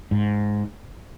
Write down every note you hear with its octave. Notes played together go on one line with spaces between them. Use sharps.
G#2